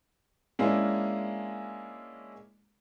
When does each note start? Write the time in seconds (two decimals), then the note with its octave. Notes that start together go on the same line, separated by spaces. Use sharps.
0.59 G#3 A#3 C#4 D4 E4